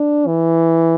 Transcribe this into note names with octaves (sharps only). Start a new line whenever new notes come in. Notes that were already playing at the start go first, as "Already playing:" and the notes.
Already playing: D4
E3